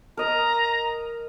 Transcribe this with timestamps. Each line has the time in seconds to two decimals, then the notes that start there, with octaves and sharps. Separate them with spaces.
0.17 A#4 D#5 A#5